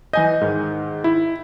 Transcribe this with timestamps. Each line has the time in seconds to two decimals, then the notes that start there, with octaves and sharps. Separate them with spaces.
0.13 E3 D#5 G#5 G6
0.41 G#2 D#3
1.04 E4